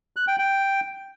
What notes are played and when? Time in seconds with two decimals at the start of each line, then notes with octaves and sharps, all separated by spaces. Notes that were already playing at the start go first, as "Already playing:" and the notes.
0.16 F#6
0.28 G5
0.39 G5